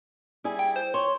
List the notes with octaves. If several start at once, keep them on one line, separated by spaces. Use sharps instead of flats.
G3 E4 G#4
G5
C5
C#5 C6